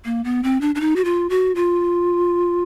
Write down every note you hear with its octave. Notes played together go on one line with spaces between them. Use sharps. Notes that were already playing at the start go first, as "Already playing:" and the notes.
A#3
B3
C4
D4
D4
D#4
F#4
F4
F#4
F4